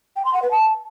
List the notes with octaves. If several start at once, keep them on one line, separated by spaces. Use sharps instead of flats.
G5
C6
F#5
B4
A5